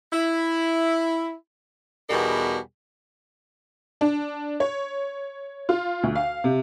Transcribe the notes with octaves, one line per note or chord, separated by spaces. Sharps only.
E4
E2 B2 G3 D#4 G#4 A#4
D4
C#5
F4
D2
F5
C3